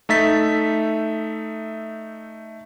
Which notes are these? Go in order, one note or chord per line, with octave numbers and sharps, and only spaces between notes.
A3 D#4 E5 A6 B6